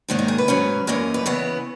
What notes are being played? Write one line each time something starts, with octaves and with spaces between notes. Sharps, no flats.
G#2 D#3 A#3 C#4 D#4
D#4
G#4
B4
G#2 F#3 C#4
F#2 E3 A#3 C#4 D#5
B4
C#3 E3 B3 C#5